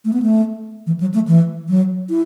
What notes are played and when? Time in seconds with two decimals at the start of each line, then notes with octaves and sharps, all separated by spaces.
0.05 A3
0.13 B3
0.22 A3
0.87 E3
1.00 F#3
1.14 A3
1.27 E3
1.69 F#3
2.10 E4